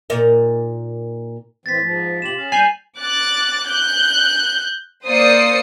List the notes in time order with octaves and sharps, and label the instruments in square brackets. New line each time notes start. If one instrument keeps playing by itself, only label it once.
[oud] A#2 D#4 A#4
[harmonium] A2 E3 C4 [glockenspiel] A6 B6
[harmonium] G#2 F3
[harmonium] C3 F4 G4 [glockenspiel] E7 F#7
[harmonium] C#4 G#4 F5
[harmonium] D#2 G3 [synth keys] G#5 G6 [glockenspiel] C7 F7 F#7
[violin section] D6 F#6 A6
F#6 G6
A#3 C5 D5 D#6 C7 C#7